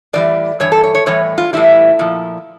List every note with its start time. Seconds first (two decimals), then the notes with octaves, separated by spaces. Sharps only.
0.13 A2 E3 G3 D5
0.60 G2 E3 C#5
0.72 A4
0.83 C#5
0.95 C#5
1.06 A2 E3 G3 C#5
1.38 F4
1.53 A2 E3 G3 E4
1.99 A#2 F3